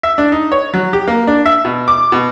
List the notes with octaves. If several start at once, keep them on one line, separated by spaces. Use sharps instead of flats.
E5
D4
D#4
C#5
F#3
G4
A#3
D4
E5
B2
D6
B2